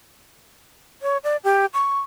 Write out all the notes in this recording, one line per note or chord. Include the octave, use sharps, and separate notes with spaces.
C#5
D5
G4
C#6